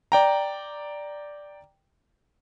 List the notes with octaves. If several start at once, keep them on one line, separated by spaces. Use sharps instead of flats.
D5 G5 A#5